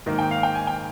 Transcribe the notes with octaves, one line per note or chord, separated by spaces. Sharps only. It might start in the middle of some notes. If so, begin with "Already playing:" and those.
G#2 D#3 A#3
G5
F5
G5
G#5
G5